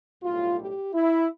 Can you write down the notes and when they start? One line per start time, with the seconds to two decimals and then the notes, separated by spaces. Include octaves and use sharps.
0.23 B1 A2 G3 F4
0.59 G4
0.94 E4